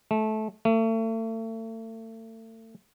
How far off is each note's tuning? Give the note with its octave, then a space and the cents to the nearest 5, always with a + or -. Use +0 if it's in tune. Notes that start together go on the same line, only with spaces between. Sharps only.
A3 -20
A3 +35